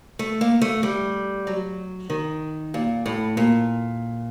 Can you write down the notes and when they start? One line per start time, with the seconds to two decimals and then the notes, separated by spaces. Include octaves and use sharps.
0.19 A3
0.41 A#3
0.62 A3
0.83 G3
1.47 F#3
2.10 D#3
2.74 A#2
3.06 A2
3.37 A#2